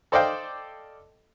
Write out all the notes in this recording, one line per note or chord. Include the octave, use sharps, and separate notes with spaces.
A4 C5 D5 D#5 F5 G5